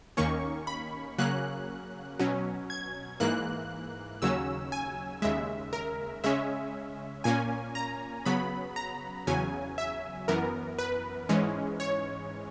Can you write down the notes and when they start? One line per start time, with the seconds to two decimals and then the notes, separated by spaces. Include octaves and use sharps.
0.17 D#2 D#3 A#3 C#4 C#6
0.67 B5
1.18 C#3 F#3 A#3 C#4 F#6
2.19 B2 F#3 C#4
2.70 G#6
3.20 G#2 E3 A#3 F#6
4.22 D#2 C#3 F#3 C#4 E6
4.72 G#5
5.22 D#2 C#3 G#3 E5
5.73 A#4
6.24 C#3 G#3 C#4 E5
7.24 A#2 A#3 C#4 G#5
7.75 A#5
8.26 C#3 F#3 B3 B5
8.76 A#5
9.27 E2 C#3 F#3 C#4 G#5
9.78 E5
10.28 F#2 E3 B3 A#4
10.79 B4
11.29 G#2 E3 G#3 C#4
11.80 C#5